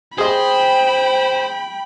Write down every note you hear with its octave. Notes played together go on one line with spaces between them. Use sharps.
G#4 C5 D#5 G5 B5